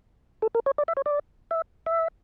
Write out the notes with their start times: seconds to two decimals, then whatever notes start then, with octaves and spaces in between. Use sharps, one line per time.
0.42 A4
0.55 A#4
0.66 C#5
0.78 D5
0.88 E5
0.97 C#5
1.06 D5
1.51 E5
1.86 E5